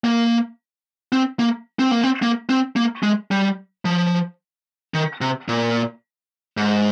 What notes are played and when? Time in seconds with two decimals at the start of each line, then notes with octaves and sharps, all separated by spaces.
0.04 A#3
1.12 C4
1.39 A#3
1.79 C4
1.91 A#3
2.04 C4
2.22 A#3
2.49 C4
2.76 A#3
3.03 G#3
3.31 G3
3.85 F3
4.94 D#3
5.21 C3
5.48 A#2
6.57 G#2